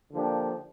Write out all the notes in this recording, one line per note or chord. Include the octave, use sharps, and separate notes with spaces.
D3 F3 A#3 D4 G4